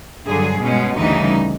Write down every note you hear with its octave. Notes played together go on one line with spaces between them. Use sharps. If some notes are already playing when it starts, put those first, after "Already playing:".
G2 D3 F#3 G#4
B2 G#3 C#4
D2 C#3 E3 G3 D#4